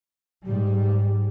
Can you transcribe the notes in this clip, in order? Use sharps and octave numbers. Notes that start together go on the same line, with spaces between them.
G#2 G3